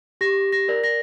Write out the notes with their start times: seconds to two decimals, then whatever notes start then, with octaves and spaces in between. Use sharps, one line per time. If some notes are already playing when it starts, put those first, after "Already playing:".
0.21 G4 A#6
0.52 A#6
0.68 A#4 D5
0.84 A#6